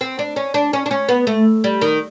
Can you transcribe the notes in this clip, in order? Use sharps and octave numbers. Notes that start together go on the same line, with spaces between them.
C4
D4
C#4
D4
C#4
D4
C#4
B3
A3
G3
D#3